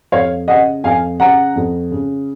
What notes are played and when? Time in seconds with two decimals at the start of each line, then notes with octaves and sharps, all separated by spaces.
0.12 F2 C#5 F5
0.48 C#3 D#5 F#5
0.84 F2 F5 G#5
1.19 C#3 F#5 A#5
1.56 F2
1.91 C#3